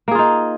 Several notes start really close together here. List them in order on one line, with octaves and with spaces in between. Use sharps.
A#3 G#4 F4 D#4